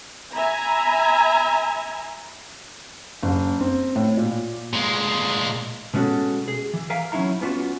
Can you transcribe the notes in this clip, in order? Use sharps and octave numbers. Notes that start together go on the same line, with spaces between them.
E5 G#5 A#5 B5
F#1
C4
A2
A#2
A#2 G#3
B2 G#3 C#4 F#4 A4
G#4
E3
A#4 E5 F5 G#5 A#5
F#3 C#4 D#4 E4 A#5
B3 C#4 D4 F4 F#4